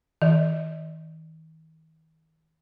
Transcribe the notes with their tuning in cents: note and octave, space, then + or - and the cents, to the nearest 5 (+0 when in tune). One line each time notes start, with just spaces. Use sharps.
D#3 +40 D5 +0